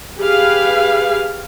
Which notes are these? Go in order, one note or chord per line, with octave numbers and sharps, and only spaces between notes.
G4 G#4 B4 F5